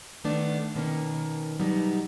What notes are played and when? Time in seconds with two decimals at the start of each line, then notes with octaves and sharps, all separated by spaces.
0.24 D#3 A3 B3 D4
0.76 B2 D#3 A#3 C#4
1.60 B2 F#3 G3 B3 D#4